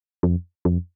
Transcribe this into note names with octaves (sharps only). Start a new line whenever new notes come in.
F2
F2